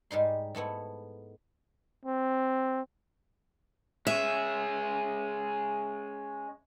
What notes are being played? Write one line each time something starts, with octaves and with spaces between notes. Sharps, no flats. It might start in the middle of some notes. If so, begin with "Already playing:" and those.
G#2 G3 D#4 C6
G#2 A3 B3 E4
C4
G#3 C#4 E5